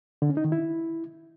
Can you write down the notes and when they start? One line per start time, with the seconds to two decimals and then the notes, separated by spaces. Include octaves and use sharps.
0.22 D3
0.29 C#4
0.37 D#4
0.45 D#3
0.52 E4